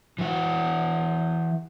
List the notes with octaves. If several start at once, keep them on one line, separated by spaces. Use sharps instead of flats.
E3 F#4